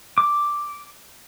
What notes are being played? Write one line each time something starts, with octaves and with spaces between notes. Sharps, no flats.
D6